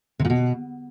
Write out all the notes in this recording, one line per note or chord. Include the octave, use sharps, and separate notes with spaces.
C3
A#2
B2